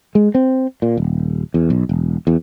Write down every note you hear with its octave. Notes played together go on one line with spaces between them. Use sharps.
G#3
C4
A#2
D#1
E2
B1
E1
E2